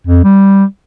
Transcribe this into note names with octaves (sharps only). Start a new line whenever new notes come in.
F2
G3